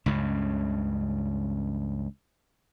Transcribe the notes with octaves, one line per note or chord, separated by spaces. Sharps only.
C#2 G2 C#3